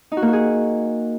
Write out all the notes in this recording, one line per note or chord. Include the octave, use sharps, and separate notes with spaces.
D#4
F#4
A#3
F#4
G#4